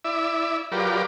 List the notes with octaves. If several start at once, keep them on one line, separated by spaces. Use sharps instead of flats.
E4 D5 E5
F#3 F4 G4 A#4 B4 D5